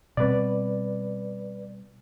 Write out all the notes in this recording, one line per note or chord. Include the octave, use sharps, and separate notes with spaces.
B2 G3 C4 B4 D5